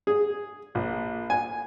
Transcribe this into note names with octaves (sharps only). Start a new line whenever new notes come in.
G#4
A#1
G#5